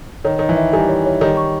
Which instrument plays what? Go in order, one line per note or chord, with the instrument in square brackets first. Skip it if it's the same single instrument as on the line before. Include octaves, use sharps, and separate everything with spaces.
[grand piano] D#3 [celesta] C#5
[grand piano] D#3 [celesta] C#5
[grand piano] E3
[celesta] E5
[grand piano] D#3 G3 [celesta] G#5
[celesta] C#5
C#5
[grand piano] D#3 G3 [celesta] C#5
[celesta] C#6